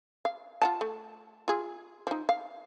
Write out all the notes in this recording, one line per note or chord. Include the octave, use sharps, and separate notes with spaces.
F5
F4 F#5 A5
A3
F4 G#4
F3 D#4
F5